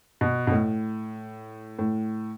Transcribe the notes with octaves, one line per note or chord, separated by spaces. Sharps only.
B2
B2
A2
A2